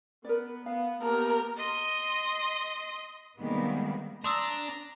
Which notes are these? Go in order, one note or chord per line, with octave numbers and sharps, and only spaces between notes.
B3 A#4 B4 D5
B3 F5
A#3 B3 G4 A#4 A5
D#5 C6
C3 D#3 G3 G#3 A#3 B3
D4 A#5 C6 D#6 E6